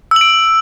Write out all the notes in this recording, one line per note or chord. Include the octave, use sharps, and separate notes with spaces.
E6 D7 F#7